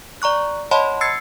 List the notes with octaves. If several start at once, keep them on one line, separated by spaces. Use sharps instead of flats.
D5 A#5 C#6 F#6
C#5 D#5 F#5 A5 B5 C6
E6 G#6 A6 C7 C#7